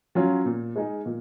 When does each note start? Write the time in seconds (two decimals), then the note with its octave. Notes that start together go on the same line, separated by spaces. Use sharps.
0.15 F#3 C#4 F4
0.45 A#2
0.76 G#3 D#4 G#4
1.05 A#2